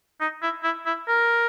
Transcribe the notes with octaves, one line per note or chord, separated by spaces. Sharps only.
D#4
E4
E4
E4
A#4